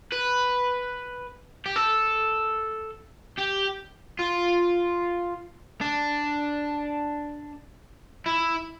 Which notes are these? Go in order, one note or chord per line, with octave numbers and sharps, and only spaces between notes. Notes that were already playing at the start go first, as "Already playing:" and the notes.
B4
G4
A4
G4
F4
D4
E4